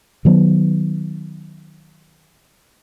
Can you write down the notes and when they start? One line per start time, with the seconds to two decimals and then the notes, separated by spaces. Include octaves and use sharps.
0.25 D#3 F#3 B3